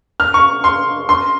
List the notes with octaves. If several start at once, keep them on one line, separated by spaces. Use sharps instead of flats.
F6
C#6
C6
C6